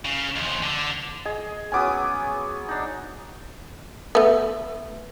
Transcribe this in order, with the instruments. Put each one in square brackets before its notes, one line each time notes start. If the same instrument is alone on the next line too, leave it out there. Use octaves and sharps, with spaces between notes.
[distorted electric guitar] C#3
D#2 F3
D3
[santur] G#4 [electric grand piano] D#5
[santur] F#3 B3 C#4 [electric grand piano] G#5 D6 D#6
[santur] D4 D#4
[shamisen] A3 B3